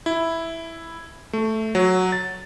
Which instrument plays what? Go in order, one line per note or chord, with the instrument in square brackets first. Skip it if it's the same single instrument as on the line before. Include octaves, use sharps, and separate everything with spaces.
[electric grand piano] E4
A3
F#3
A6